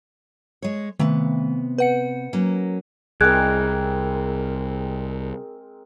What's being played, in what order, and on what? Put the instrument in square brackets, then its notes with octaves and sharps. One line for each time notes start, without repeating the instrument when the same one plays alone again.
[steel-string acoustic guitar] G#3 C#5
[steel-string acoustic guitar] C3 B3 [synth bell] D#3 A3
[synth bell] B4 F#5 C#7
[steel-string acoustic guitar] F#3 A#3 C#4
[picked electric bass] C2 [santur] G#3 C4 A#4 [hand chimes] G#4 [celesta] F#6 G#6